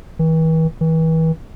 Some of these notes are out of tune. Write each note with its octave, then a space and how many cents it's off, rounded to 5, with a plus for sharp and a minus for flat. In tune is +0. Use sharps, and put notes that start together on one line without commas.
E3 -40
E3 -35